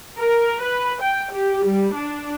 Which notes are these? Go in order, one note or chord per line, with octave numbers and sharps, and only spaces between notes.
A#4
B4
G5
G4
G3
D4